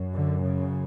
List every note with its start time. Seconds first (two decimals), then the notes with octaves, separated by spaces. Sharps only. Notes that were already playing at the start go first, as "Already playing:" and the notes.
Already playing: F#2
0.14 D3
0.44 C#3